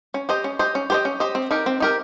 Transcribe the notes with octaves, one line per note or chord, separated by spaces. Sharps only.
C#4
G4 C5 D#5
C#4
G4 C5 D#5
C#4
G4 C5 D#5
C#4
G4 C5 D#5
C4
D#4 G4 A#4
C4
D#4 G4 A#4